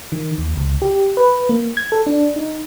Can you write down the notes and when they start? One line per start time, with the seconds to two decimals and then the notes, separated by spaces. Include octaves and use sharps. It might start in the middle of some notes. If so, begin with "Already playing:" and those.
0.12 D#3
0.38 D#2
0.57 C#2
0.82 G4
1.17 B4
1.49 A#3
1.77 G#6
1.92 A4
2.07 D4
2.36 D#4